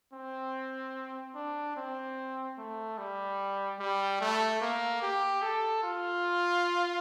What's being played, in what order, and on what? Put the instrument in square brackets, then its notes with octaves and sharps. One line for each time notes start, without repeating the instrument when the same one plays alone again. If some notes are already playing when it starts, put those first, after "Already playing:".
[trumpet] C4
D4
C4
A3
G3
G3
A3
A#3
G4
A4
F4